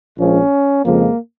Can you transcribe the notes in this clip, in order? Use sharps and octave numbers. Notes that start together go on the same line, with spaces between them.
A#1 A#2 F3 G#3 C#4
F2 C#3 F3 G#3 A#3